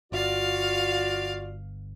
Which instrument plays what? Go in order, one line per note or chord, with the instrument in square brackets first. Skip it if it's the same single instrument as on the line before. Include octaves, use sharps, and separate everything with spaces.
[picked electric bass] G1 [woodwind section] F4 F#4 D5 [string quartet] F5